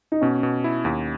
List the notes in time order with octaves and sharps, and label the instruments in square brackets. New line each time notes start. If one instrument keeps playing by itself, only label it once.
[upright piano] D#4
[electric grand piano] B2 [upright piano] C#4
[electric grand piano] B2
E4
D#2